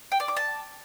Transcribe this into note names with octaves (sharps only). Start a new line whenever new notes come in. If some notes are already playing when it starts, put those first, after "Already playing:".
G5
D5
D6
A5